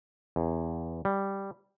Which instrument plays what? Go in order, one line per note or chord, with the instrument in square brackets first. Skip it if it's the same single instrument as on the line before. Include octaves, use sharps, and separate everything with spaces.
[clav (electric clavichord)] E2
G3